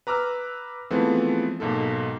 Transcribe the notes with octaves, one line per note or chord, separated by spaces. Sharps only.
B4 A#5 D6 E6 F6
E3 F3 G#3 A3 B3 C4
B1 G#2 A#3 A4